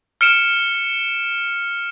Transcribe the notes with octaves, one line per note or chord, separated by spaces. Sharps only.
F6 C#7 D7 E7